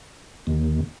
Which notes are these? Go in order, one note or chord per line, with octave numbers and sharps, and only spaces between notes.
D#2